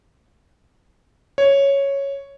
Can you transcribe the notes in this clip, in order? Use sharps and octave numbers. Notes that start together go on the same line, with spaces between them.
C#5